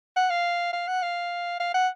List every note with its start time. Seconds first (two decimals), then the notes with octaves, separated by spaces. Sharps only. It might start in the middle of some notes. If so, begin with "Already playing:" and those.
0.16 F#5
0.30 F5
0.73 F5
0.88 F#5
1.02 F5
1.60 F5
1.74 F#5